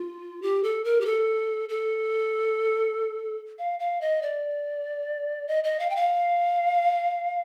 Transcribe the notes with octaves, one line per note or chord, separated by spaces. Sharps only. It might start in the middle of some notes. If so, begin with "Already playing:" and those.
Already playing: F4
G4
A4
A#4
G4
A4
A4
F5
F5
D#5
D5
D#5
D#5
F5
G5
F5